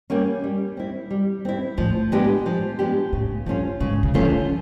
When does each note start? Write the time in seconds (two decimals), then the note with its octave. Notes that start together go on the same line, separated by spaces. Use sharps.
0.10 G3 A#3 C#4
0.44 G3
0.77 C4 E4
1.11 G3
1.45 C4 E4
1.78 A2 F3
2.12 G#3 B3 D4 G4
2.46 F3
2.79 G#3 B3 D4 G4
3.13 A2 C#3
3.46 G2 F3 A3 C#4 F4
3.80 G#2 C#3
4.03 C#3
4.14 F3 A3 C#4 F4
4.20 D#3
4.25 D3